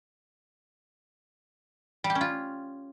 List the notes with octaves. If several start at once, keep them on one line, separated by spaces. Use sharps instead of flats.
G3
G4
C#4
F4